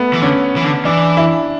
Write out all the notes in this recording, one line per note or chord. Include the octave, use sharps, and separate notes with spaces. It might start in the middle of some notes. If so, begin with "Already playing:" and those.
Already playing: A3 B3
E3
D3 C#4
E3
D3
E3 D4
E4